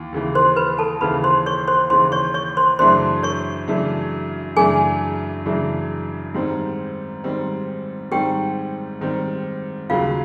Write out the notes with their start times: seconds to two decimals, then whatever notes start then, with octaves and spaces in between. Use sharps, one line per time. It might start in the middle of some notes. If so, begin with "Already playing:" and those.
Already playing: D#2 E3
0.12 D#2 C#3 E3
0.35 C5 C6
0.56 B4 B5
0.79 A4 A5
1.01 D#2 C#3 E3 B4 B5
1.24 C5 C6
1.46 C#5 C#6
1.68 C5 C6
1.90 D#2 C#3 E3 C5 C6
2.12 C#5 C#6
2.34 C#5 C#6
2.57 C5 C6
2.79 F#2 C#3 E3 A3 D4 C5 C6
3.23 C#5 C#6
3.68 F#2 C#3 E3 A3 D4
4.57 F#2 C#3 E3 A3 D4 G#4 G#5
5.46 F#2 C#3 E3 A3 D4
6.34 G#2 D#3 G3 C4
7.24 G#2 D#3 G3 C4
8.12 G#2 D#3 G3 C4 G4 G5
9.01 G#2 D#3 G3 C4
9.90 D#2 C#3 F#3 F4 F5